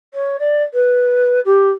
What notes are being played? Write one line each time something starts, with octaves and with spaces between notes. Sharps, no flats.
C#5
D5
B4
G4